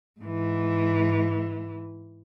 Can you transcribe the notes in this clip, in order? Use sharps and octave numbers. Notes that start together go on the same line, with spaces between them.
G#2 E3